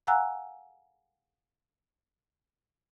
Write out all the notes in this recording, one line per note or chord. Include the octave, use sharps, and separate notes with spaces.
F5 F#5 G#5 A#5 E6 F#6